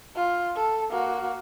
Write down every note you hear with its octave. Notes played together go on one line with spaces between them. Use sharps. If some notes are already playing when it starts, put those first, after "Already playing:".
F4
A4
A#3 F#4